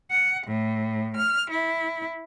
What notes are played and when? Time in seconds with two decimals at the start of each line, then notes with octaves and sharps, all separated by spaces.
0.11 F#5
0.47 A2
1.16 F6
1.50 E4